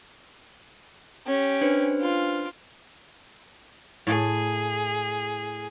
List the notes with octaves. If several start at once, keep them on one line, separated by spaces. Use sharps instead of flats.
C#4 G4
D4 B4 C5
F4
A2 G#4